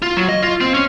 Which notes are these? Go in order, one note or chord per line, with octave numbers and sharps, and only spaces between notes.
F4
F#3
D#5
F4
C4
C#4